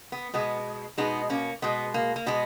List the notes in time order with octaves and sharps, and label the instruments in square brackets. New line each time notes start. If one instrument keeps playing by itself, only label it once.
[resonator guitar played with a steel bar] B3
B2 G#3 B3
B2 G#3 B3 D#4
A#3 C#4
B2 G#3 B3
A#3
A#3
B2 G#3 B3